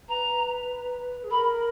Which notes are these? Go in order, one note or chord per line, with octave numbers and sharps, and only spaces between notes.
B4 A#5
G#4
A#4 B5